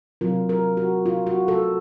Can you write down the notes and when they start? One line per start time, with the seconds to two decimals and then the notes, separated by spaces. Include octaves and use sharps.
0.21 C3 F#3 C4 F4 A#4
0.49 A#4
0.77 F#4
1.06 F4
1.27 F#4
1.48 A4